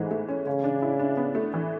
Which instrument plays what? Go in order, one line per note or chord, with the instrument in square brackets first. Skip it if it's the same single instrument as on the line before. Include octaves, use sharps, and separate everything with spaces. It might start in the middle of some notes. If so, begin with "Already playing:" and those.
Already playing: [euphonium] G#2 [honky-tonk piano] E3 G#3 A3
[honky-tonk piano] A3
C#4
[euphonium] C#3 [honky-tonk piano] C#4
[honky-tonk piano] D4
E4
D4
B3
A3
E3